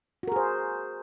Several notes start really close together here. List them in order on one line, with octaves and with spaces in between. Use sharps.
F#4 A#4 G#4 C5